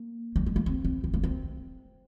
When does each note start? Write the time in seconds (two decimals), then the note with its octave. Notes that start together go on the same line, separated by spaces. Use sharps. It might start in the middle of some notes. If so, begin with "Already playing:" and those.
Already playing: A#3
0.36 G3
0.46 G#3
0.56 A#3
0.66 C4
0.85 C4
1.04 C4
1.14 A#3
1.23 C4